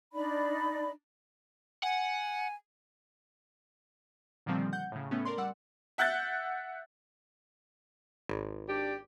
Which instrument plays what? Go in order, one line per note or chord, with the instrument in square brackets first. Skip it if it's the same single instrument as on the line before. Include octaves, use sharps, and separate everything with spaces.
[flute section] D4 D#4 D5 B5
[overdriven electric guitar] F#5 [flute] G#5
[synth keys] A#2 D3 D#3 F3 G3 C4
F#5 G6
A2 C#3
A2 A3 B3 C#4
A#4 D5 C6
G3 D5 F#5 E6
[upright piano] E5 F#5 F#6 G6 A6
[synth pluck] G#1
[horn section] D4 G4 D5